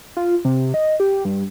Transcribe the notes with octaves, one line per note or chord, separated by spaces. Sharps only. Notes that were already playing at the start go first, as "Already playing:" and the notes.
F4
C3
D#5
G4
G2